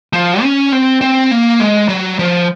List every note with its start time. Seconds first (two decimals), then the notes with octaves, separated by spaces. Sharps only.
0.13 F3
0.42 C#4
0.72 C4
1.01 C4
1.31 A#3
1.59 G#3
1.89 F#3
2.19 F3